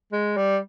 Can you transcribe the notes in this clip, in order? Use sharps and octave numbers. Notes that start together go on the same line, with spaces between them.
G#3
G3